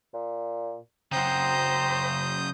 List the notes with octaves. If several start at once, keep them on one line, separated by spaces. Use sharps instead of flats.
A#2
C#3 F#3 C4 C5 A#5 D#6 G6